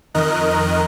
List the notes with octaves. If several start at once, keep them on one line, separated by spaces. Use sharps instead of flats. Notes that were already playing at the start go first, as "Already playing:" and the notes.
F2 D#3 A#4 D#5 F#6